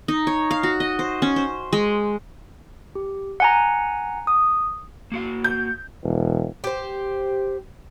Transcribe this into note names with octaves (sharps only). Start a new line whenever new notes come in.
D#4
C#5
F5
F#4
D#5
C5
C#4
C5
G#3
G4
F#5 G#5 A#5
D#6
A#3 F#4 F5
G6
E1
G4 C5